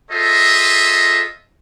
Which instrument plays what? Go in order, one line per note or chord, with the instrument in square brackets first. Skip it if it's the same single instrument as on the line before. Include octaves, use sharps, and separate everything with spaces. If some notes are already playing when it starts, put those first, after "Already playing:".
[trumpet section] F4 G#4 A4 C5 D#5 E5